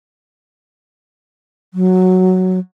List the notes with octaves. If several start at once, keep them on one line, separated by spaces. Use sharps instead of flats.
F#3